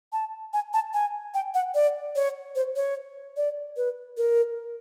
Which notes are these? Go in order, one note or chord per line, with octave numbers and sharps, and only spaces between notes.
A5
G#5
A5
G#5
G5
F#5
D5
C#5
C5
C#5
D5
B4
A#4